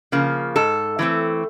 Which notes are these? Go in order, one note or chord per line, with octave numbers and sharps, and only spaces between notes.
C#3 F3 A#3
G#2 A4
E3 A3 C4